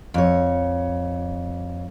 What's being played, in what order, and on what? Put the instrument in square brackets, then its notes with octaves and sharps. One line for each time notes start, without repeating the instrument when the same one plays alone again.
[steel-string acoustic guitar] F2 C#5